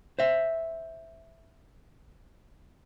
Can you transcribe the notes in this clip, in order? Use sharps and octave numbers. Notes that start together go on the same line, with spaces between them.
C5 E5